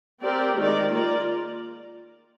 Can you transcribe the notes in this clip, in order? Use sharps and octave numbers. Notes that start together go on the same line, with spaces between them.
C4 G4 A#4 D5
D#3 G#3 D#4 A#4 D5
A#3 F4 A#4 D5